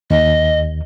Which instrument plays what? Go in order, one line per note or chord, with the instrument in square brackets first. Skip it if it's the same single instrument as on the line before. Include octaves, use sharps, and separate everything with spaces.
[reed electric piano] D#2 [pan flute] D#5